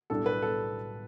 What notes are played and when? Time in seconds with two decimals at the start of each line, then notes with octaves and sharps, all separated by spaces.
0.10 B1 A2 G3 D4 A4
0.26 B4
0.42 A4